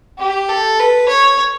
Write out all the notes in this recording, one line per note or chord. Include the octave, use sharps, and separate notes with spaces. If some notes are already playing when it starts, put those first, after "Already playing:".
G4
A4
B4
C#5